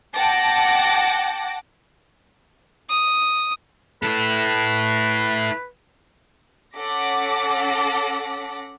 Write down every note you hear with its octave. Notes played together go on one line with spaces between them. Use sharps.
F#5 G5 A5 D6 A#6
D#6
E4 A4 B4
C#4 A4 F#5 D6 A#6 B6